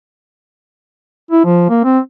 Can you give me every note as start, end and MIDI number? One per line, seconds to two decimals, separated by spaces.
1.31 1.45 64
1.45 1.66 53
1.69 1.84 58
1.84 1.99 60